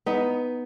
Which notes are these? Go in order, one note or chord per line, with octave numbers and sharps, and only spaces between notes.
B3 D#4